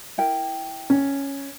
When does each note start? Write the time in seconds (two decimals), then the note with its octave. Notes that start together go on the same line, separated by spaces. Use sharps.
0.18 E4 A#4 G5
0.90 C#4